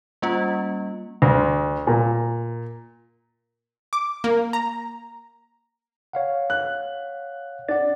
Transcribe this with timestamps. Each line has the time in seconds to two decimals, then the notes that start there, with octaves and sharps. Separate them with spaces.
0.22 G3 A#3 C#4 F4
1.22 D2
1.87 A#2
3.93 D6
4.24 A#3
4.53 A#5
6.13 C#5 F5 F#5
6.50 F#6
7.69 D4 F#5 A6